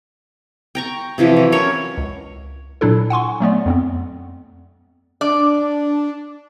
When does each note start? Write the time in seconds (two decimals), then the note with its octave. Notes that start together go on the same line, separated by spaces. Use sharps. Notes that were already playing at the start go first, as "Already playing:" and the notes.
0.75 G5 A#5 C#6
1.18 C3 E3 F3 E4
1.37 F#3
1.52 C#4 A#4 C#5 A#5
1.98 C#2
2.81 A#2 F#3 D4 E4 A4
3.10 F#5 G#5 C6 C#6
3.40 F#3 A3 B3 D5
3.66 F2 B3 C4
5.21 D4 D5